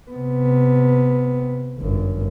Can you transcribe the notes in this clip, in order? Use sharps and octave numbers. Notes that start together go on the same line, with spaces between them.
C3 B3
G1 F#2